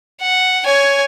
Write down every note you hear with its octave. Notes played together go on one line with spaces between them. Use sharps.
F#5
C#5 G#5